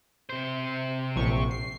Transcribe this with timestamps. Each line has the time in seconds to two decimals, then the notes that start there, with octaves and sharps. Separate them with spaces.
0.30 C3 C5
1.16 A#1 C#6
1.51 C7